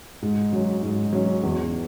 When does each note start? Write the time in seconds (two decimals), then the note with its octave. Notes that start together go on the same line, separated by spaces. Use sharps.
0.22 G#2
0.53 F#3 C#4
0.83 G#2
1.13 F#3 C#4
1.43 E2